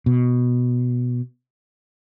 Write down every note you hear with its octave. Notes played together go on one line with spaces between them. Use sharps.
B2